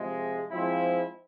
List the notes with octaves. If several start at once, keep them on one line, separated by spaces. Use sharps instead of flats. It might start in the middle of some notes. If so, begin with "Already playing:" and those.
Already playing: C3 F3 G#3
F3 G#3 C4 E4